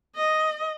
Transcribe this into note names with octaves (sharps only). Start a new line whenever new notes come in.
D#5